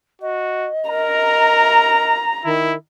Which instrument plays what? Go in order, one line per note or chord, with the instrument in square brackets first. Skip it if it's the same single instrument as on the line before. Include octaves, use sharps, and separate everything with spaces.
[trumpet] F#4 [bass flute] D#5
[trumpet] A#4 [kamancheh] A#5
[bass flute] D#3 [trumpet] E4